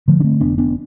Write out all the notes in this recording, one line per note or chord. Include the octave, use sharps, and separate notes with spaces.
D3 F3 A3
D4
A3 C4
F1 B3 D4
B3 D4